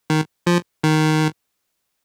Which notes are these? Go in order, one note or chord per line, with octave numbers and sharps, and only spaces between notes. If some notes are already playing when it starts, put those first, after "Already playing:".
D#3
F3
D#3